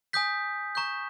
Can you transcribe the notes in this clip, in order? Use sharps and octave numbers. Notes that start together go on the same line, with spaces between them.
G#5 D#6 G6 B6
A#5 C#6 G6